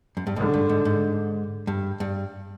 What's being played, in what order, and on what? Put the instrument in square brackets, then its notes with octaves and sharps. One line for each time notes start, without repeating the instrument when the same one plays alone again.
[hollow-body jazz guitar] F#2
G2
[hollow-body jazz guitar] G#2 [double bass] D3
[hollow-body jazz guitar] G2
G#2
G#2
G2
G2